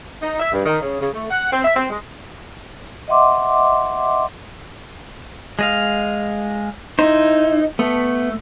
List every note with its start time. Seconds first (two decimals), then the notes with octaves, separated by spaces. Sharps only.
0.22 D#4
0.40 E5
0.52 G2
0.65 D#3
0.82 C#3
1.00 C#3
1.13 A3
1.31 F#5
1.52 C4
1.64 E5
1.76 C4
1.90 G#3
3.08 D#5 E5 F#5 C6 D6
5.59 G#3 D#5 F5
6.99 D#4 E4 C5
7.79 A3 B3